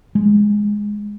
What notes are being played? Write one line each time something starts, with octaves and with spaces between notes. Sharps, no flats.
G#3